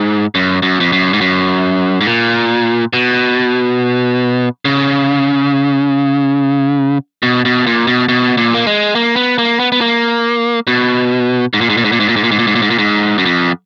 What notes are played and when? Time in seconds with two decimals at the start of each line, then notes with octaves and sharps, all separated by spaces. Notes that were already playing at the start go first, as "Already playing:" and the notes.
Already playing: G#2
0.35 F#2
0.62 F#2
0.80 F2
0.92 F#2
1.13 G#2
1.21 F#2
2.01 G#2
2.06 A#2
2.93 B2
4.65 C#3
7.23 B2
7.45 B2
7.67 A#2
7.87 B2
8.09 B2
8.37 A#2
8.54 A#3
8.67 G#3
8.95 A#3
9.16 B3
9.38 A#3
9.60 B3
9.72 B3
9.81 A#3
10.67 B2
11.53 G#2
11.61 A#2
11.70 G#2
11.77 A#2
11.85 G#2
11.92 A#2
12.00 G#2
12.09 A#2
12.16 G#2
12.24 A#2
12.32 G#2
12.39 A#2
12.47 G#2
12.55 A#2
12.62 G#2
12.70 A#2
12.79 G#2
13.18 F#2
13.26 F2